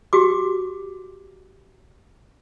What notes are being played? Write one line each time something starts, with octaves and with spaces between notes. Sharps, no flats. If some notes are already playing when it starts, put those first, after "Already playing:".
F#4 G4 D6